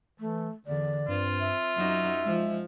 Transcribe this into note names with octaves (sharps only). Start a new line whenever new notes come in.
E3 A3
E2 D3 D5
G2 C4 F4
E5
F#2 F#3 D#4 F#4
F3 G#3